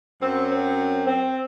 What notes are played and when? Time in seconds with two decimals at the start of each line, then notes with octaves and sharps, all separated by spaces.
0.20 F#2 F#3 C4
0.49 C4
1.07 C4